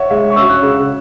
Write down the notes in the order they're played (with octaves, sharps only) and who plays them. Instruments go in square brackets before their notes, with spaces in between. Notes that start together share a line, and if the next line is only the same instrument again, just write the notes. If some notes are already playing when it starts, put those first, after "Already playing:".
Already playing: [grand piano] C#5 E5 F#5
[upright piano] G#3 [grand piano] E5
[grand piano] C#6
[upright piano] C#4 F#4 [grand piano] E6
[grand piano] F#6
[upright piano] C#3